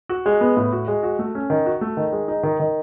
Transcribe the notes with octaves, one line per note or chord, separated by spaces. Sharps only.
F#4
G#3
B3
A2
F#4
G#3
F#4
A3
C#4
D#3
F#4
A3
D#3
G#3
D#4
D#3
D#3